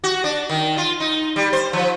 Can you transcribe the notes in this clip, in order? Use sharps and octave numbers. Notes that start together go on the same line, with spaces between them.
F#4
D4
D#3
F4
D#4
G3
C5
F3